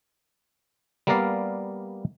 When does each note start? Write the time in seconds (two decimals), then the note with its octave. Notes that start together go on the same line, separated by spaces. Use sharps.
1.07 G3 A#3 B3 A#4 D5 F5